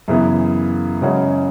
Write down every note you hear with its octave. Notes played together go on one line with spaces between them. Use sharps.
F#2 C#3 E3 B3
F#2 C#3 G#3 C#4 F#4